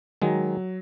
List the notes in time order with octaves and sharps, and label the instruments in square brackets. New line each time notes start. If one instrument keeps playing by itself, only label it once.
[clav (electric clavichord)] D#3 G#3 [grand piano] F#3